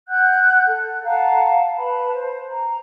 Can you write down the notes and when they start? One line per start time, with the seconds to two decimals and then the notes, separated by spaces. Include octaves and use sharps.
0.07 F#5 F#6 G6
0.66 A4
1.03 F5 F#5 A5 A#5
1.77 B4 A5 B5
2.13 C5
2.49 A#5